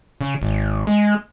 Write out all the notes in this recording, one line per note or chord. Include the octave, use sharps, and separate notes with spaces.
C#3
G#1
G#3